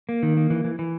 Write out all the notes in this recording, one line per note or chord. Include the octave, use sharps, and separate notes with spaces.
A#3
D#3
A#3
E3
E3
E3